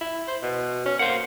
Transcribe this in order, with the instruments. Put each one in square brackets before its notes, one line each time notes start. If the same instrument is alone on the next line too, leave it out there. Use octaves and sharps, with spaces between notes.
[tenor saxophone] E4
C5
B2
C#4
[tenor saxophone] A#3 [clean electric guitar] C5 F#5